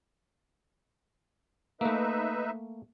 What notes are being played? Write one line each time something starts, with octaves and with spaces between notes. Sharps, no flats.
A3 A#3 D#4 B4 E5